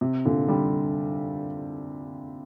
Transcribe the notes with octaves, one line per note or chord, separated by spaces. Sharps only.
C3
A#2 D3
D3 G3